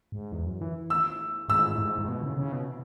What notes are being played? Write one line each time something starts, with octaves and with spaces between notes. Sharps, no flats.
G#2
E2
F#2
E3
E6
G#2 E6
G#2
G#2
B2
C#3
C#3
B2